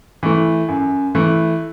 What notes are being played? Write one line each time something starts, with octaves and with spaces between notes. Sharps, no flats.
E3 A3
F#2
E3 A3